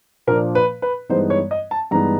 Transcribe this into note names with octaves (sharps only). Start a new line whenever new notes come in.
A#2 F3 A#3 D4 A#4
B4
B4
G2 E3 G#3 B3 D#4 C5
C#5
D#5
A5
G2 E3 G#3 B3 D#4 A#5